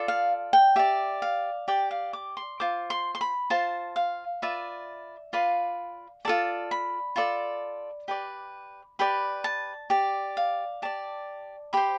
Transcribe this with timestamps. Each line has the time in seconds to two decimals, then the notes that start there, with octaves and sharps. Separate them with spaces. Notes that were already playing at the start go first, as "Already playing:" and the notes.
Already playing: F4 A4 D5
0.08 F5
0.53 G5
0.76 G4 D5 E5
1.22 F5
1.68 G4 D5 G5
1.91 F5
2.13 D6
2.37 C6
2.60 F4 C5 D6
2.90 C6
3.15 C6
3.21 B5
3.50 F4 C5 A5
3.96 F5
4.42 F4 B4 D5 E5
5.33 F4 B4 D5 F5
6.25 F4 A4 D5 A5
6.71 B5
7.16 F4 A4 D5
8.08 G4 B4 D5
8.99 G4 B4 D5 B5
9.44 A5
9.90 G4 D5
10.37 F5
10.82 G4 D5 A5
11.73 G4 C5 B5